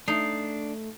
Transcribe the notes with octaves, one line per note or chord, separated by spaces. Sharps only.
A3 D4 D#4 C7